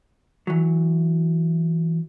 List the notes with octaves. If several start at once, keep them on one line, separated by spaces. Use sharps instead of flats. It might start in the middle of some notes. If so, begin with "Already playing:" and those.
E3 F#3